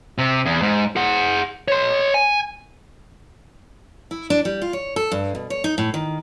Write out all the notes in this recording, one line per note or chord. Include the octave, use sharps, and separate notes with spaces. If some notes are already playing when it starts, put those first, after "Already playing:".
C3
E2
G#2
G#4 F#5
C#5 C6
G#5
E4
D4
G3
F4
C#5
A4
G2
B2
C#5
D#4
A2
D#3